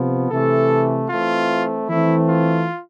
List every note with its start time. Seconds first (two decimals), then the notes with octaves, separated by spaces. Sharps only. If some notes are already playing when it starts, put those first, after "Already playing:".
Already playing: C3 F3 B3
0.30 C3 E3 A3 A4
1.09 E3 A3 C4 F4
1.88 E3 A3 C4 E4
2.27 F4